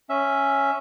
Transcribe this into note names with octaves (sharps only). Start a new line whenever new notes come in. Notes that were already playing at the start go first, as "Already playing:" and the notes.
C#4 E5